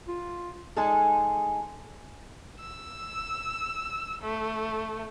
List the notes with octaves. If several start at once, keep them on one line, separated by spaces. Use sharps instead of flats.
F4
G#3 D#4 G#4 A4
E6
A3